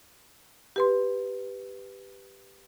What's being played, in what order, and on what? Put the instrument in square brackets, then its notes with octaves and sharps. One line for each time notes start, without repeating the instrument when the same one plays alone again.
[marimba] G4 B4 C6